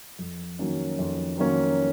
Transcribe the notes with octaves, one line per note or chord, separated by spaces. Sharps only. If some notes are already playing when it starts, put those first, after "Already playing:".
F2
D#3 F#3 A#3 C#4
F2
D#3 F#3 A#3 C#4